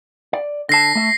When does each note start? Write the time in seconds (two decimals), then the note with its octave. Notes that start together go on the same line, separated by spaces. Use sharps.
0.33 D5
0.69 D3 A5 A#6 C7
0.95 A3 E5